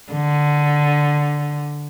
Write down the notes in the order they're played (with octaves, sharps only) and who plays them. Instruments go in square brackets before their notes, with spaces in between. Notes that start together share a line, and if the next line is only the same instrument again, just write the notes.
[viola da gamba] D3